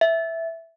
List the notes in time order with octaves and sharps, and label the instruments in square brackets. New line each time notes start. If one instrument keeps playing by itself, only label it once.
[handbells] E5